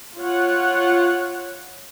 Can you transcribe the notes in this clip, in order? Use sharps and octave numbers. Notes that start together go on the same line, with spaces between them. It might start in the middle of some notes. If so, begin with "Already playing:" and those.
F4 C#5 F#5